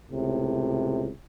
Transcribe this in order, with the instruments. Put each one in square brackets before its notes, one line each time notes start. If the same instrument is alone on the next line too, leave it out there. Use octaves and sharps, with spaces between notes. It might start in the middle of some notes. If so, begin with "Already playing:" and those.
[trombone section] C#2 A2 C3